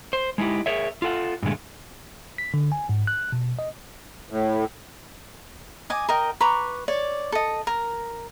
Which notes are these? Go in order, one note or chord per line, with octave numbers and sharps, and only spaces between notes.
C5
G#3 D#4 E4 G4
G#4 A#4 C#5 E5
F4 A4 F#5
G2 A#2 D3 G#3 A3
B6
D3
G#5
G#2
F#6
B2
D#5
A2
D#5 G#5 D6
A#4 D#5 G5
B4 A#5 C#6 D6
C#5 D5 D6
A4 D#5
A#4